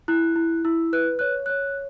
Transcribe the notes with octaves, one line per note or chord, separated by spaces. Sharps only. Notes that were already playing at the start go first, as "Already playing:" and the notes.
E4 F#6
E4
E4 E6
B4 F#6
C#5 F#6
C#5 F#6